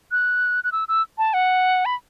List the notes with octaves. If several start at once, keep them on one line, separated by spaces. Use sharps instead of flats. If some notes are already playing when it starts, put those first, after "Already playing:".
F#6
F#6
E6
E6
A5
F#5
B5